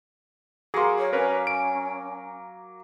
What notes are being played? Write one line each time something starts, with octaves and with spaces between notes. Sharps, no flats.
F#3 A#3 G#4 C6
C#5
C#4 A#4 B4 C#5
D7